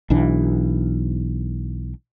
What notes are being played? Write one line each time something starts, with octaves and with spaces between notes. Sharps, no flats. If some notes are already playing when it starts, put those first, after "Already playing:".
B1 E3 D4